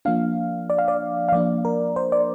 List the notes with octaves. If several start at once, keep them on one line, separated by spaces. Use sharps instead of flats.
F3 A#3 D4 F5
D5
F5
D5
F5
F3 A#3 D4 D5
A#4
C5
D5